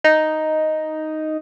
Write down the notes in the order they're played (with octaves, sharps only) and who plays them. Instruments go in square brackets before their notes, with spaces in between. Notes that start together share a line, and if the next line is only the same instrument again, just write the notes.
[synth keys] D#4